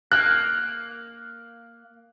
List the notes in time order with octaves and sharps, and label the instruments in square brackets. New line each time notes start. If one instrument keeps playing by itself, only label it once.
[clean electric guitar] A#3 [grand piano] F#6